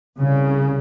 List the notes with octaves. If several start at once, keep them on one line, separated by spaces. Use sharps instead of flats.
C2 C#3